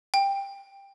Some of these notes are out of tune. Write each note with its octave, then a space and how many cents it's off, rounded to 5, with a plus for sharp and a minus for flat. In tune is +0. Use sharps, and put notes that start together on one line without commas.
G5 +15